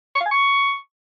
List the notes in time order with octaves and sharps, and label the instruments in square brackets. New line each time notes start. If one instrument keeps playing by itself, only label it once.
[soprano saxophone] C#6
F5
G#5
C#6